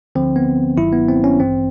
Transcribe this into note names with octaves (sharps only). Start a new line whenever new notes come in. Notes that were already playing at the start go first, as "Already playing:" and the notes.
D2 D3 F3 C4
B3
G1 G2 D#3 F#3 E4
B3
C4
C#4
A1 G2 E3 C4